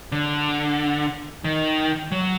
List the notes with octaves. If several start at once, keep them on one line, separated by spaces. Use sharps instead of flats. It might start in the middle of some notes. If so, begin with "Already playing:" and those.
D3
D#3
F#3